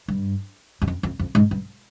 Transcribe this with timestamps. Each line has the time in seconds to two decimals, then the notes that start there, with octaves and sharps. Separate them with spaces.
0.08 G2
0.82 F#2
0.88 F2
1.03 F2
1.19 F2
1.35 G#2
1.51 G2